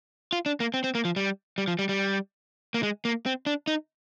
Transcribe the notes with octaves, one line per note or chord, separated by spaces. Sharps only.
F4
D4
A#3
C4
C4
A#3
F3
G3
G3
F3
G3
G3
A#3
G#3
A#3
C4
D4
D#4